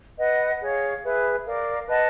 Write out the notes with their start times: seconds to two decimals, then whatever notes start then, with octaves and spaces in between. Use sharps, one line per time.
0.18 B4 D#5 F#5
0.60 G#4 C#5 F5
1.03 G#4 B4 E5
1.44 A#4 D5 F5
1.87 B4 D#5 F#5 A5